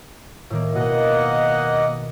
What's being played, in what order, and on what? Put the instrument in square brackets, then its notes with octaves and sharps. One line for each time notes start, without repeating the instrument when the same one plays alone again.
[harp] A2 D#3 A#3
[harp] B2 [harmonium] A#3 D#5 F#5